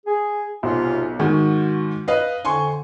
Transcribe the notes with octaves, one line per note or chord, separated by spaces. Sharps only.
G#4
B1 G#2 C3 F4
G#2 D#3 F#4
B4 D#5 F5
F2 D3 G#5 C6 C#6